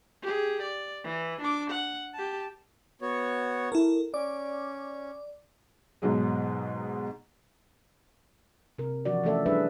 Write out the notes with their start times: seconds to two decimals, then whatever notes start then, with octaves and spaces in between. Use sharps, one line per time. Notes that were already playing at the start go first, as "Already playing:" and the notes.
0.22 G4 G#4
0.62 D5
1.04 E3
1.41 D4 D6
1.70 F#5
2.14 G4 A5
3.01 B3 F#4 C#5
3.72 E4 A4 A#4
4.14 C#4 D5 D6
6.02 G#2 B2 F#3 G#3
8.78 C3 A#4
9.05 E3 F3 F#4 D5
9.24 E3 A3 C#4 A4 D5 E5
9.46 G3 D4 G#4 B4 E5